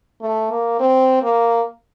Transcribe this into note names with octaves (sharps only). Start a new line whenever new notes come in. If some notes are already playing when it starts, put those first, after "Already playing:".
A3
A#3
C4
A#3